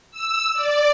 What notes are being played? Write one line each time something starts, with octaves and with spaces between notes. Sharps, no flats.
E6
D5